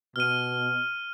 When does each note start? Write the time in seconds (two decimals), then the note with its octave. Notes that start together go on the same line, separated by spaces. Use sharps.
0.16 B2 F6 D#7